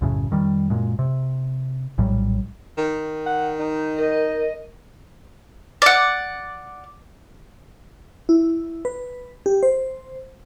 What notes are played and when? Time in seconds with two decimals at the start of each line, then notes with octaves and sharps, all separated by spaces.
0.01 B1 F#2 A2 C#3
0.31 F2 D#3 G3
0.70 F#2 A#2 G#3
0.99 C3
1.98 A#1 A2 F#3 G3
2.78 D#3
3.26 F#5
3.59 D#4
3.99 A#4 D#5
5.82 D5 F#5
8.29 E4
8.85 B4
9.46 G4
9.63 C5